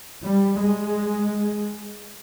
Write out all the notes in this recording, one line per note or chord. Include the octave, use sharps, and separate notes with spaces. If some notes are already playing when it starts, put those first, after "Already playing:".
G3
G#3